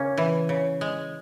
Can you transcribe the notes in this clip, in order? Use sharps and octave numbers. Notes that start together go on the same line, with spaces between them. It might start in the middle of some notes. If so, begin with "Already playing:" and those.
Already playing: C#3 A#3 C#4
E3
C#3
G#3